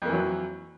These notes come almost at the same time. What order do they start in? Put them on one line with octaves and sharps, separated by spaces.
F2 A#3 E3 F#3